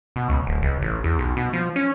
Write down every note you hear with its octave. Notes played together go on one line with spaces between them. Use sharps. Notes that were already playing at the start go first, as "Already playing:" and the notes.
B2
C#2
D1
C#2
A1
E2
B1
B2
F3
C#4